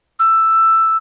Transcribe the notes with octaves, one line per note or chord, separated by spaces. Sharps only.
E6